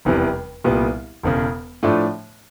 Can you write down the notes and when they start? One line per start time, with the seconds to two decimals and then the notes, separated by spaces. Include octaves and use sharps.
0.05 F1 E2 C3 E3 G3
0.64 C2 A#2 G3 B3
1.23 E1 E2 C#3
1.83 A2 F3 A3 D4